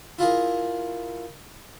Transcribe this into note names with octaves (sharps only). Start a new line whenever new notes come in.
E4 F4 G#4 A#4